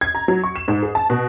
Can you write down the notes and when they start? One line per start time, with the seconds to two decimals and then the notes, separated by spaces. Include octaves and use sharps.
0.01 G#6
0.15 A#5
0.28 F#3
0.44 C#6
0.56 E7
0.68 G#2
0.83 G#4
0.95 A5
1.10 B2